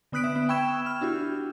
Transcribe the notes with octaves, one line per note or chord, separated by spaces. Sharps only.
D3 B3 D#6 F#6 B6 D7
E5
B3
G5 B5 C#6 E6 G#6 E7
F6
D4 E4 F#4 G4